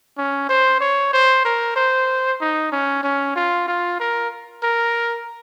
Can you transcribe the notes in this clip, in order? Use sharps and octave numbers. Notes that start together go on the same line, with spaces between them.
C#4
C5
C#5
C5
A#4
C5
D#4
C#4
C#4
F4
F4
A#4
A#4